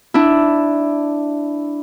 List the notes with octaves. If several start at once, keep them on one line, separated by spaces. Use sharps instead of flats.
D4 E4